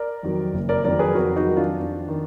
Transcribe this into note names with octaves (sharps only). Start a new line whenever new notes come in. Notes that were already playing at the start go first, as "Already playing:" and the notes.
Already playing: A#4 D5
F2 D#3 F#3
F#1
A#4 D5
F2 D#3 F#3 A#4 D5
G#4 B4
F2 F#4 A#4
D#4 F#4
D#3 F#3
D4 F4
F2
D#3